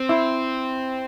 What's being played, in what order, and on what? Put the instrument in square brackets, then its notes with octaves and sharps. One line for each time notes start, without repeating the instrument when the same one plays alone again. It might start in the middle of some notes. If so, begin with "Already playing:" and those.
Already playing: [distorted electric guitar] C4
[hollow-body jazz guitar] E4